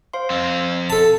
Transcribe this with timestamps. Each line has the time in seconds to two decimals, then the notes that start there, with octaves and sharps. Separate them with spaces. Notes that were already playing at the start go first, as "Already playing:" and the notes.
0.13 C5 F5 C6
0.30 F2 C4
0.90 A4 A5